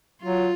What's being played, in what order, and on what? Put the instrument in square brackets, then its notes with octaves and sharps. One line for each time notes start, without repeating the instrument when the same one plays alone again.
[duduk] F#3 [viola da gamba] F4